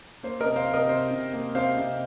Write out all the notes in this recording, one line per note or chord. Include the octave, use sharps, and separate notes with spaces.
A#3 C5
A#4 D#5
C3
C5 F5
C3
A#4 D#5
C3 C5
C3
A#3
C3 C5 F5
C3